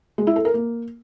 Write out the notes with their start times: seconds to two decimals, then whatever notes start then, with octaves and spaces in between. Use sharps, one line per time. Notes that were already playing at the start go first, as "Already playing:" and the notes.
0.18 G#3
0.27 E4
0.36 A4
0.45 A#4
0.54 A#3